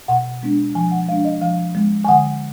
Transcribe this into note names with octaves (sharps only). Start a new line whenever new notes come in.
B2 F#5
G#3 B3 D4
F3 G#5
F#5
G#3 D4 F5
D#5
F3 F5
G#3 B3
G#5
D3 F#5